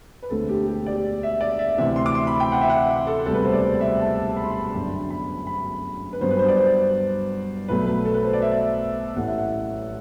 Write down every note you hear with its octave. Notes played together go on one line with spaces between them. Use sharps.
B4
E1 D2 D3 A3 C4 A4
G4
G4
D5
E5
D5
E5
D2 C3 E3 E5
C6
D6
C6
B5
G5
F#5
E5
F#5
E5
A4
E1 D2 C3 G3 A4
B4
C5
D5
E5
A5
B5
C6
B5
G1 F#2 D3
B5
B5
B4
G2 F#3 B3 C5
B4
C5
D5
C5
B1 B2 F#3 A3 B4
B4
A4
B4
C5
D5
E5
A1 A2 E3 A3 F#5
E5
F#5